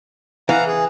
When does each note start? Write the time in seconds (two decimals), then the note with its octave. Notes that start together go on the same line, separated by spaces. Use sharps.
0.49 E3 F5 F#5 A#5
0.67 G#4